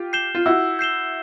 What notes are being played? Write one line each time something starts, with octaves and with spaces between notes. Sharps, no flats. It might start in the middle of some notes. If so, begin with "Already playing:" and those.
Already playing: F4 G4
G6 C7 E7 G7
F4
E4 F#4 E6
G6 C7 E7 G7